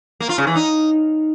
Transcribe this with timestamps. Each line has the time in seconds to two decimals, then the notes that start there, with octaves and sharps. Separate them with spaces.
0.20 A#3
0.29 F4
0.38 C#3
0.47 E3
0.56 D#4